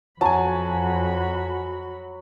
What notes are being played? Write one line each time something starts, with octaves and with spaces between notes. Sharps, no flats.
F2 F#3 F#4 G#5 A5 B5